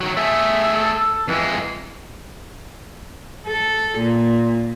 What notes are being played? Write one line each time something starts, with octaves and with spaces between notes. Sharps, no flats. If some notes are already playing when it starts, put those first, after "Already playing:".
D#3 F#3
A3 G#4 E5
A4
F2 E3 G#3
A4
A#2